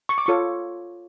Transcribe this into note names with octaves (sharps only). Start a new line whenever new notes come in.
C#6
D6
F4 A4 C#5 C#6